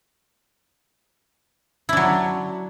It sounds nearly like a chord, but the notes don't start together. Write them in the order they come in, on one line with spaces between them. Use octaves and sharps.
E4 D4 F#3